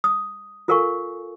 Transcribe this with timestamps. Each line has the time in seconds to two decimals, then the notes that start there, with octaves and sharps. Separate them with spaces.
0.04 D#6
0.68 F4 A4 A#4 F5 G#5 C#6